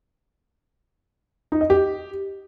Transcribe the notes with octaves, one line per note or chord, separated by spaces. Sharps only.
D#4
D#5
G4